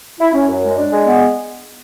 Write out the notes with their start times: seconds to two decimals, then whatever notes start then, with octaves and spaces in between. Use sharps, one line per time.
0.20 E4
0.34 C#4
0.48 F#2
0.63 G#3
0.77 D4
0.92 G#3
1.05 B3